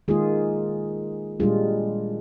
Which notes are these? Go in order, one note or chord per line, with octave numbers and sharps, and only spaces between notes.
D#3 G#3 A#3 F4 G#4
A#2 G3 G#3 D4 F4 G#4